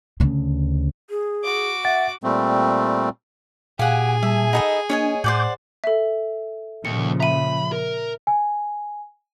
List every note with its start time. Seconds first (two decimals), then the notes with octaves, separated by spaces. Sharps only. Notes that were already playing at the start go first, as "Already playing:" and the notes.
0.20 D2 C#3
1.10 G#4
1.44 F#4 D6
1.85 E5 F#5 A6
2.24 A#2 G3 A3 C4
3.79 A#2 G4 G#4 F5 F#5 G#5
4.23 G3 E5 A5
4.53 D#4 A4 D#5 F#5 B5 D#6
4.89 A#3 D4 C#5 D#5 G#5
5.24 A2 C5 D5 F#5 D6 G6
5.84 A4 E5
6.85 D#2 A#2 C#3 F3 C#7
7.20 E5 A#5 B5 D#7
7.72 A#4
8.27 G#5